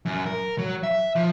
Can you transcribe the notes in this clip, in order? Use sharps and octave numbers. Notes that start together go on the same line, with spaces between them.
F#2
A#4
F#3
E5
F3